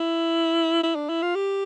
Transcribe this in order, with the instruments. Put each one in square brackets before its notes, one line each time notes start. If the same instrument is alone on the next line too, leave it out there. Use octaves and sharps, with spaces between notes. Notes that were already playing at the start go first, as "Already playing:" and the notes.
Already playing: [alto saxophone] E4
E4
D4
E4
F4
G4